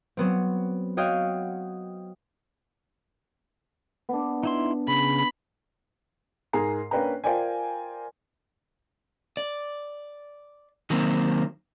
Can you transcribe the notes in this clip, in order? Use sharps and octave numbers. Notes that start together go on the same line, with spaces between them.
F#3 B3 C4
F#4 C#5 D#5 F5 G5
B3 D4
D#4 E4 C6
C#3 B5
G#2 G#4 A#4 A#5 C7
A#3 C#4 D4 B4 G5 A#5
F4 A#4 C5 D5 G5 G#5
D5
D#3 F#3 A#3 C4